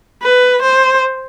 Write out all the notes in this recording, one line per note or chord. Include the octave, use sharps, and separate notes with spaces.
B4
C5